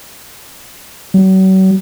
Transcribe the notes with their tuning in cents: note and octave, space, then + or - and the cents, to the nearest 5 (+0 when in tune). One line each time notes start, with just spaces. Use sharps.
F#3 +40